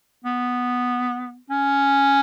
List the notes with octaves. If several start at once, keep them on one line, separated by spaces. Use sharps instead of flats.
B3
C#4